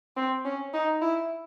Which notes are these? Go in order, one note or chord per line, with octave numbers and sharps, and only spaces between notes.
C4
C#4
D#4
E4